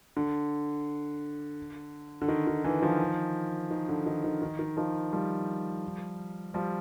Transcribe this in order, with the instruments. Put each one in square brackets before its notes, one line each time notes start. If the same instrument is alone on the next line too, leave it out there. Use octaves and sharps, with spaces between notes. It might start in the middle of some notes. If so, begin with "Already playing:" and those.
[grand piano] D3
D3
D#3
D#3
D3 E3
D#3 F3
D#3
D3
D#3
D#3
D#3
D#3
D#3 F3
F3 G3
F3 G3